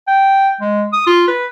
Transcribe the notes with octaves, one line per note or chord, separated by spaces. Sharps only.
G5
G#3
D#6
F4
B4